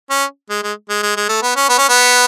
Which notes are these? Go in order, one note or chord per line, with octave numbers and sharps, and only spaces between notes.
C#4
G#3
G#3
G#3
G#3
G#3
A3
B3
C#4
B3
C#4
B3